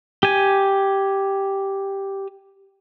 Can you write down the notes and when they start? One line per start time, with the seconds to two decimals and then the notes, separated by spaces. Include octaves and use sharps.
0.23 G4 G#5